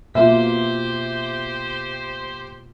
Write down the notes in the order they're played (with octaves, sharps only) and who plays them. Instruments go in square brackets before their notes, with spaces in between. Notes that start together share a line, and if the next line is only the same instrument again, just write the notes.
[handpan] B2 F4 [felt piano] A#3 E5 [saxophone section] G4 C5